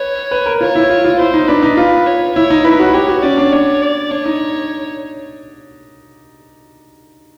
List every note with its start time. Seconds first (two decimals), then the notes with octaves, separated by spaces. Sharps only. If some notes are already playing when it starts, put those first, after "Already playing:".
Already playing: B4 C#5
0.31 B4
0.46 A#4
0.61 F4 C#5
0.75 E4
0.90 F4
1.04 F4
1.18 E4 C5
1.34 D#4
1.47 D4 B4
1.63 D#4
1.77 F4 B4
2.06 C#5
2.36 E4 C#5
2.50 D#4
2.64 E4 B4
2.79 F#4
2.94 G4 C#5
3.08 F#4
3.23 C#4 D5
3.37 D4
3.52 D4 C#5
3.82 D5
4.11 D4 C#5
4.25 D#4